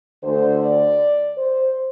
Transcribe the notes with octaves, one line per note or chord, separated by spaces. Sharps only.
D2 D3 A3 C5
D5
C5